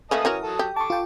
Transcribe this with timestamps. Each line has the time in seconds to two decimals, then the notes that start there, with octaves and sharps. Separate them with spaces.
0.11 A3 A#3 C#4 B4 D#5 A5 D#6
0.25 E3 C#4 F#4 A#4
0.43 F#3 A4
0.59 G4
0.76 A4 A5 C#6 D6
0.90 F4 G5